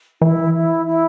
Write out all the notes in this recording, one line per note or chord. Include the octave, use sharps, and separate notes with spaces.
E3 E4
E4
E4